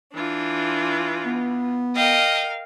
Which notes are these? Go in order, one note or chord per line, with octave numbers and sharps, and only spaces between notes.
E3 D4 F4
B3
A#4 D#5 F5 G5